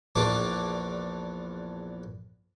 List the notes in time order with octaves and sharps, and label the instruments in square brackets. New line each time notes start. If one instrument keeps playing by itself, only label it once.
[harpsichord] A#1 E2 E3 D4 D6